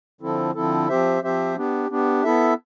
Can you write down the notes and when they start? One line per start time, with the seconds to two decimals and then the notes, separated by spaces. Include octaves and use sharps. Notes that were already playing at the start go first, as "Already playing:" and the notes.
0.21 D3 F3 C4 E4 A4
0.55 D3 F3 C4 E4 A4
0.89 F3 C4 G4 C5 E5
1.22 F3 C4 G4 C5 E5
1.56 B3 D4 G4
1.90 B3 D4 G4
2.24 B3 E4 A4 E5